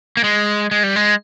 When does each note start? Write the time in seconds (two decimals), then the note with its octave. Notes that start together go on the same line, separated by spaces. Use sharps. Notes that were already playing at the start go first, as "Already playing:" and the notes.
0.17 A#3
0.24 G#3
0.71 G#3
0.83 G3
0.96 G#3